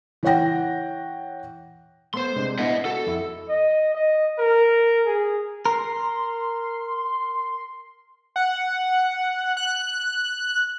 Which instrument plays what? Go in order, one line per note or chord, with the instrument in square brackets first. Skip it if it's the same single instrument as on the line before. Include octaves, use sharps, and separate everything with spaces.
[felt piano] E3 E4 C#5 F#5 G5 A#6
[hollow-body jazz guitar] A3 B3 [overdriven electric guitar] C5 C6
[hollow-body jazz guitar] C3 G#3 D4
[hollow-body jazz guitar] B3 D4 E4 [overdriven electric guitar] D#5 F#5
[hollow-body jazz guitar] F#4 [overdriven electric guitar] A4
[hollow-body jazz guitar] F2 E4
[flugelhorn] D#5
D#5
A#4
G#4
[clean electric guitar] A#4 [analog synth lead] C6
[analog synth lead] F#5
F#6